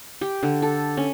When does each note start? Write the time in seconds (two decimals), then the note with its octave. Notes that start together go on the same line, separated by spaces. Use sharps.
0.21 G4
0.43 D3
0.62 A4
0.97 C#4